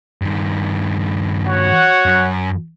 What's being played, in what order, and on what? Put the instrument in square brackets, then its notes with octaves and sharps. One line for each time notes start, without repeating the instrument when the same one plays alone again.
[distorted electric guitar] G2 D#3
[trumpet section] F#4 C#5 F#5
[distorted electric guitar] F#2